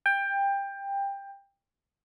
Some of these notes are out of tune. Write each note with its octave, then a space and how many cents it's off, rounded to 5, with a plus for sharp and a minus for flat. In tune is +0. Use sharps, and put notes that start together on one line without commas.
G5 +20